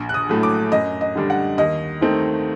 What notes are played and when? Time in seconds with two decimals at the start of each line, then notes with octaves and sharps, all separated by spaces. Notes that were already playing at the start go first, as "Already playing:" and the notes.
Already playing: A#1
0.09 F#6
0.14 D#6
0.29 A2 F#3 A3
0.43 D6
0.72 F#2 D#5
1.01 D#5
1.15 D3 G3 D4
1.30 F#5
1.58 D#2 D#5
2.01 D#3 A3 C4 D#4